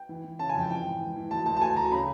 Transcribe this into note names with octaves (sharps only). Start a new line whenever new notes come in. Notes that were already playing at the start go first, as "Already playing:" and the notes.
Already playing: G5
E3
E3
C#3 A5
G#5
F2
G5
E3 G5
G#2
E3
E3
D2 A5
D2 A5
A5
D2 G#5
F#3 A#5
C#3 B5